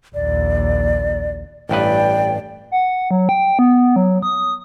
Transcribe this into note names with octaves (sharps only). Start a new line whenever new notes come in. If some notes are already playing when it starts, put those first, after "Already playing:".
A#1 D#2 D5
A1 G2 B4 D5 G5
F#5
F#3
G5
B3
F#3
D#6